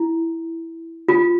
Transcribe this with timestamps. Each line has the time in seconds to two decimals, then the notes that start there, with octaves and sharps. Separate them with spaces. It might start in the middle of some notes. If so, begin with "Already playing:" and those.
Already playing: E4
1.08 F4